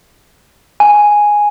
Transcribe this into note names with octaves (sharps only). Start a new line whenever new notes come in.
G#5